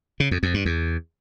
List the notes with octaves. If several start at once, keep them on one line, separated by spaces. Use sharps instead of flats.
C#3
F2
F2
G2
E2